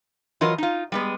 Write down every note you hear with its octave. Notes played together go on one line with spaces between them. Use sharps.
E3 F#3 F4 A#4 D#5
D#4 F4
G3 G#3 B3